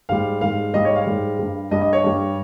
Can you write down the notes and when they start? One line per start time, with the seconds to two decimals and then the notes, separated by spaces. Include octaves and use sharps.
0.09 G#2 G3 F5
0.41 G#2 G3 F5
0.74 G#2 G3 D#5
0.85 C#5
0.96 F5
1.07 G#2 G3
1.39 G2 G3
1.71 G2 G3 D#5
1.82 D#5
1.93 C#5
2.04 G2 G3